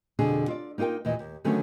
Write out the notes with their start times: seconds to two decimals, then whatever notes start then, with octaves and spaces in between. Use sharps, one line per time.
0.19 F2 B2 D3 D4 G#4
0.48 F4 D5
0.78 A#3 D#4 F4 A#4 G5
1.05 D#2 A#2 E3 D#5
1.19 D#2
1.44 D3 D#3 F#3 A3 B3 C#4